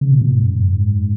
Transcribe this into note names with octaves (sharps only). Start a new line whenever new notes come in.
C#3
B2
A#2
G#2
F#2
G#2